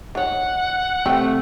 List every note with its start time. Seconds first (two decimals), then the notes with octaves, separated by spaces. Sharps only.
0.15 D#3 C#5 F#5
1.06 C3 A3 G4